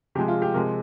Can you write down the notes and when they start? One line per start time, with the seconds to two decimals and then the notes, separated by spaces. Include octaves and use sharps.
0.15 C3 F3 G#3 G4
0.28 F4
0.42 G4
0.54 C3 F3 G#3 A#4